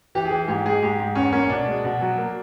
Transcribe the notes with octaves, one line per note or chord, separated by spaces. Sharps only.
E3 G4
G#4
E3
G#2 G4
G#3 G#4
G#2 G4
G#2
E2 C#4
A#3 C#4
B2 D4
G#3
B2
F#3
A#3